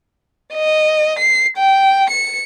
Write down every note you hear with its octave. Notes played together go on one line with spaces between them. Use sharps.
D#5
C7
G5
C#7